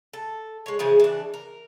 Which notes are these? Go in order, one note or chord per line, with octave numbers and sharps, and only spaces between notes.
A4
G#3 C#5
C#3 E3 F3 G#4
E3 D4
A#4